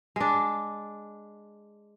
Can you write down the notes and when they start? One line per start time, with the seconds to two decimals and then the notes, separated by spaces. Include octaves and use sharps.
0.16 G#3 D4